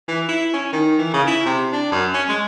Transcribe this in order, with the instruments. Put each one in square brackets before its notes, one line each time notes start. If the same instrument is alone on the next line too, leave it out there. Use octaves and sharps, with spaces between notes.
[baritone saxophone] E3
E4
C#4
D#3
E3
C#3
E4
C3
D4
F#2
C#4
G#3